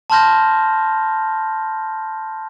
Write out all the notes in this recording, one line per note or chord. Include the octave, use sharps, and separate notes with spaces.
A5 B5 C6 F6 G6 A#6